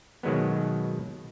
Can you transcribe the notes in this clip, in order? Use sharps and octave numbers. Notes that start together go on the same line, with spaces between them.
B2 D#3 F#3 G#3 B3